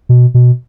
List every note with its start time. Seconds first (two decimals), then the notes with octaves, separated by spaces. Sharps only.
0.09 B2
0.34 B2